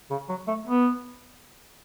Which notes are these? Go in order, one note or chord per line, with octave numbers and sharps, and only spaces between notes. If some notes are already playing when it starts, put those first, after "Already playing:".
C#3
F#3
A3
B3